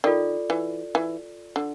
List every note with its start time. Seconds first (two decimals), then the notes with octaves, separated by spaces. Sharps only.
0.04 D#3 F4 A4 D5
0.50 E3
0.95 E3
1.56 D3